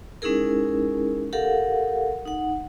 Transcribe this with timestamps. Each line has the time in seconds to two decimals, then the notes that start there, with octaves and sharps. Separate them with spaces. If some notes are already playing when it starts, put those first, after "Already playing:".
0.22 G#3 C#4 D#4 E4 G#4 A#4
1.33 G4 A4 A#4 F5 F#5
2.26 D#4 F#5